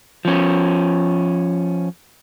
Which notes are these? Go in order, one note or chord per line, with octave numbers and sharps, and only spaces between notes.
F3 C#4